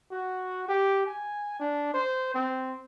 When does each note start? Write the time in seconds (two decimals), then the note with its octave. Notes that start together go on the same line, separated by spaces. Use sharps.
0.11 F#4
0.68 G4
1.06 G#5
1.59 D4
1.94 C5
2.35 C4